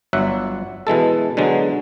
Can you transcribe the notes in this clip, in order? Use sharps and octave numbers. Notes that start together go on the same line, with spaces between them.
G1 F#3 E5 F#5
B2 E3 G#3 A4
B2 D3 F#3 G#3